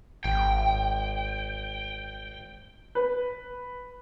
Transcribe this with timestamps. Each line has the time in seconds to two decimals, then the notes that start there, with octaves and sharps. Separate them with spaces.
0.24 G#1 G5
2.95 B4